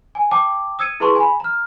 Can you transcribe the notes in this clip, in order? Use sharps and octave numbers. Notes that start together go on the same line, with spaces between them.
G#5
G5 A5 D6
D#6 E6 G#6 C#7 D#7
E4 G#4 B4 A5 C6 C#6
G#5 B5
A#5 F6